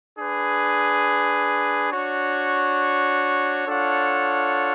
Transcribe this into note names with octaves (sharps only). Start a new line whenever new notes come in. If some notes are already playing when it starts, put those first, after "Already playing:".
D4 G#4 B4
D4 F#4 C#5
D4 F4 A4 C#5 F#5